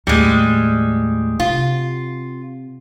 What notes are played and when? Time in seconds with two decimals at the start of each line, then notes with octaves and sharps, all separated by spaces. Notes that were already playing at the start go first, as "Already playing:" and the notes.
0.07 D#2 A2 G3 G#3
1.40 C3 F4